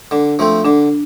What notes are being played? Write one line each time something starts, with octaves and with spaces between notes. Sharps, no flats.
D3 D4
F3 A3 C4
D3 D4